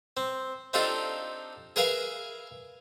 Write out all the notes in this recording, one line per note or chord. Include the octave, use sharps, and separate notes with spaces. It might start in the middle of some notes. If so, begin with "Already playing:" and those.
C4
C4 D4 D#4 F4 G4 A4
G#4 A#4 B4 E5 F5 G#5